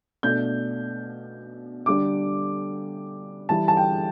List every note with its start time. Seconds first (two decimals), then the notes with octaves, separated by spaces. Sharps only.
0.23 B2 A3 D4 G6
1.86 D3 G3 D4 D6
3.49 E3 G3 E4 A5
3.68 A5
3.77 G5